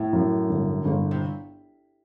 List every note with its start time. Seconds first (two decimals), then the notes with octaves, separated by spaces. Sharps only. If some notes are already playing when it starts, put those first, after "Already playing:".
Already playing: A2 E4
0.13 F#2
0.49 G1
0.85 G1
1.11 C3